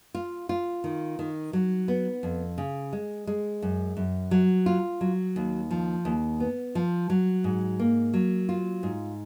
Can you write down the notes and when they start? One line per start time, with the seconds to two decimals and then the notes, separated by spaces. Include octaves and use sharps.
0.15 F4
0.49 F4
0.84 D#3
1.19 D#3
1.53 F#3
1.88 B3
2.23 F2
2.58 C#3
2.93 G#3
3.27 G#3
3.62 F#2
3.97 F#2
4.31 F#3
4.66 F4
5.01 F#3
5.36 D#2
5.71 F3
6.05 D#2
6.40 B3
6.75 F3
7.10 F#3
7.44 G#2
7.79 A#3
8.14 F#3
8.49 F4
8.83 G#2